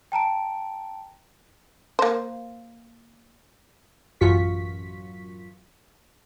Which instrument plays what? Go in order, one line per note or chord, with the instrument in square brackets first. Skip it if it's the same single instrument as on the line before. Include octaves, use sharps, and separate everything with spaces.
[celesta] G5 A5 A#5 D7
[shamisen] A#3 C5
[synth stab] A1 F#2 F4 F#4 C#6 B6